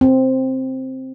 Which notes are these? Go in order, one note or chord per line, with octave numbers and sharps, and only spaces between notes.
C4